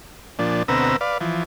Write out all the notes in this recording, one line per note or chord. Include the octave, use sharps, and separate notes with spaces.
A#2 F3 D4
D2 B2 C4 B4 A#5 E6
B4 D5 F5
E3 F3